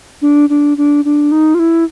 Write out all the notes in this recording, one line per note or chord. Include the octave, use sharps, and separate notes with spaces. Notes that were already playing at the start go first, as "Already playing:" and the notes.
D4
D4
D4
D4
D#4
F4
E4